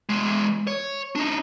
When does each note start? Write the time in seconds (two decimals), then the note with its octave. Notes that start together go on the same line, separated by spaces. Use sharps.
0.09 E2 G#3
0.67 C#5
1.15 D4 D#4